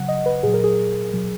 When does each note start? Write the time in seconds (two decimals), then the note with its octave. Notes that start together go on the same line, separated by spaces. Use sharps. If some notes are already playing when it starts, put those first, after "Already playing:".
Already playing: C#3 F#3 F#5
0.08 D#5
0.26 B4
0.43 A#2 F#3 G#4
0.54 A#4
0.64 G#4
1.13 B2 F#3